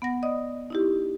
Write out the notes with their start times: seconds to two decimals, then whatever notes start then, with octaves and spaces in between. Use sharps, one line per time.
0.02 B3 F#5 A#6
0.23 D5 D#5 D#6
0.70 D#4 E4 G4